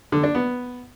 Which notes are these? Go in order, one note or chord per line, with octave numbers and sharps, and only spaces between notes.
D3
D4
B3